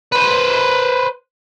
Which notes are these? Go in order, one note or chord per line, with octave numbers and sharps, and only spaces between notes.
B4 C5